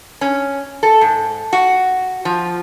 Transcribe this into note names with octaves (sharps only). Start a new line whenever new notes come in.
C#4
A4
G#2
F#4
F3